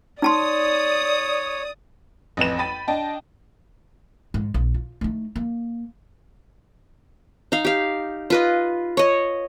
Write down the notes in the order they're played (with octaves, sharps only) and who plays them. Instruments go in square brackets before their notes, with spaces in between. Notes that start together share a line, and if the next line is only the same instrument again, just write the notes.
[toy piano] D#4 A5 C6 [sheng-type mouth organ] C#5 [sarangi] D5 [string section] D#6
[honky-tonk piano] A1 F2 B4 E7
G5 B5 A6 D#7
D4 D#5 G5 A5
[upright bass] G#2
A#1
F4
A3 D#4
A#3
[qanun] D#4 F5
G4 F5
F4 B4 D#5
C#5 D#5